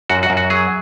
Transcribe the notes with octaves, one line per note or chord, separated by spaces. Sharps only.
F#2 F#4
F#4
F#2
F#4
F#3 G#4